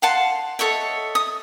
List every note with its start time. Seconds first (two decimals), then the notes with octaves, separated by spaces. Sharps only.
0.02 F5 F#5 A5 C6
0.59 A4 C#5 D#5 E5
1.15 D#6